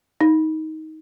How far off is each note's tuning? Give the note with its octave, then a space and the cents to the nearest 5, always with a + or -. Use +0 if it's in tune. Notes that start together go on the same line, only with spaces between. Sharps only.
D#4 +20